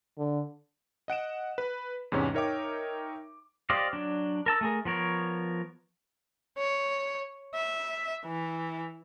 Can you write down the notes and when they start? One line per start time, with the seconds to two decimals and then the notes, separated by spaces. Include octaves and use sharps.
0.18 D3
1.08 D#5 F#5 D7 E7
1.58 B4
2.12 E2 G#2 C3 C#4 C#5
2.34 D#4 A#4 C#5 E5 G5 D6
3.70 G4 C5 D5 D#5 F5
3.93 F#3 D4
4.46 A#4 A5 E6
4.61 A3 G#4 A#4
4.85 F3 B3 A#4 C#5
6.58 C#5
7.54 E5
8.25 E3